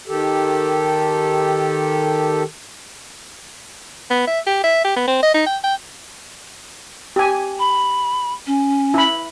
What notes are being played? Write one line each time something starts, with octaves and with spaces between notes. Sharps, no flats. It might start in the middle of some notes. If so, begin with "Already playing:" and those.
D#3 G4 A4
B3
E5
G4
E5
G4
B3
C4
D#5
D#4
G5
G5
G4 G#5
B5
C#4
E4 B5